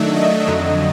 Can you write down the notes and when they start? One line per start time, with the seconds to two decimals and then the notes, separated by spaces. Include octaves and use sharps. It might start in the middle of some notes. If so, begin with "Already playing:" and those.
Already playing: D#3 F#3 A3 D4 E5
0.16 D#5
0.47 F2 D3 F#3